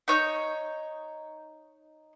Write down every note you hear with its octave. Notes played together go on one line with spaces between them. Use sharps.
D#4 C#5 G6